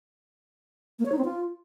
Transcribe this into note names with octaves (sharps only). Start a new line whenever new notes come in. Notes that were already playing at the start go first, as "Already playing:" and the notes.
A#3
C#5
D#4
C4
F4